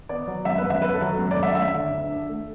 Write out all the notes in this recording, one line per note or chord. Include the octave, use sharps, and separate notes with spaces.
B3 D5
F#3
F#2 E5
B4
F#2
E5
B3 B4
A4
F#3
F#2
D5
F#2
E5
A3 E5
D3
D2
D4
A3